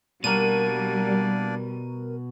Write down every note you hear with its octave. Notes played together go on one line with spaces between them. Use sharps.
B2 G3 A#3 D4 F#4 A#4 D5 D#7